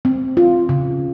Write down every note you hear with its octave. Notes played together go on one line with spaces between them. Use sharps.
C4
F4
C#3